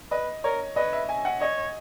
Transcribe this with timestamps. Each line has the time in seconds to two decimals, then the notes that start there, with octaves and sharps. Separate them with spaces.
0.11 B4 D#5
0.44 A#4 C#5
0.76 B4 D#5
0.93 E5
1.09 G#5
1.25 F#5
1.41 C#5 D#5